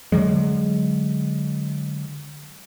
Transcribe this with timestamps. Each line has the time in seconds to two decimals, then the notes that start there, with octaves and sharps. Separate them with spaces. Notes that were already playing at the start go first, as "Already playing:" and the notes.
0.12 D3 E3 F#3 G#3